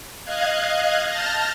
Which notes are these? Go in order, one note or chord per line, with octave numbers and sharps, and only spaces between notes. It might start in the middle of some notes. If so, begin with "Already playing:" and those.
D#5 F5 F#6 G#6
A5 F6 G6 A6 A#6